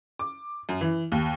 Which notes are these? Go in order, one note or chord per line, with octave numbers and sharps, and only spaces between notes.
D6
F#2
E3
D#2